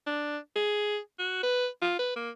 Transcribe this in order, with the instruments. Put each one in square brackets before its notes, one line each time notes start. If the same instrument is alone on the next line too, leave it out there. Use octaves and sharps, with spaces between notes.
[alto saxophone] D4
G#4
F#4
B4
F4
B4
A#3